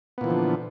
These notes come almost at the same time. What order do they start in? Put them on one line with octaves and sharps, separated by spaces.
B3 A#2 E3 F3 D3